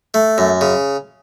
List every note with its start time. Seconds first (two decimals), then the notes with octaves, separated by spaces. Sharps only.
0.14 A3
0.38 F#2
0.61 C#3